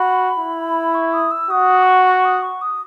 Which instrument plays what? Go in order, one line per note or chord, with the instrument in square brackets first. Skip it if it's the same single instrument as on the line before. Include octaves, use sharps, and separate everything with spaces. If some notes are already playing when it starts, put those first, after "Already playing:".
Already playing: [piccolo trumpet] F#4 [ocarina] B5
[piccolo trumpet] E4
[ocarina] C#6
D#6
E6
[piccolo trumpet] F#4 [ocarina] D#6
[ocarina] D#6
C#6
C#6
D#6
C#6
D#6